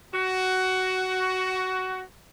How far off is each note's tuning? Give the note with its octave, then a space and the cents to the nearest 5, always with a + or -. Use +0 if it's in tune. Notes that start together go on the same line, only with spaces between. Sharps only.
F#4 +15